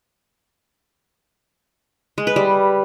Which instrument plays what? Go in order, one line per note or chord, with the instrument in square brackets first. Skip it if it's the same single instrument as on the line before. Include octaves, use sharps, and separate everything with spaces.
[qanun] G#3
B4
G3